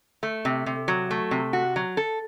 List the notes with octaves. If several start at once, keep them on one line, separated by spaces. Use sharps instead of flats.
A3
C3
C3
F#3
A3
C3
F#4
F#3
A4